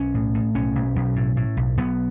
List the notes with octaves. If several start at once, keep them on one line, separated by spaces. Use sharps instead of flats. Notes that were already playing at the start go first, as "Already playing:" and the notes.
Already playing: B1 C#4
A2
A2
B1 C#4
B1
B1
A2
A2
B1
B1 B3